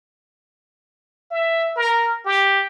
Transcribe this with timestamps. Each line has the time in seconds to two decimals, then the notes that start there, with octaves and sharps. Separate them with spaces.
1.31 E5
1.76 A#4
2.26 G4